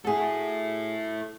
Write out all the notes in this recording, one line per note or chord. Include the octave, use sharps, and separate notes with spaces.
E4 F#4 G#4 A4